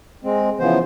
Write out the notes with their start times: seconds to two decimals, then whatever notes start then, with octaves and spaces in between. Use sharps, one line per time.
0.24 G#3 C4
0.59 C#3 E3 F3 B3 C5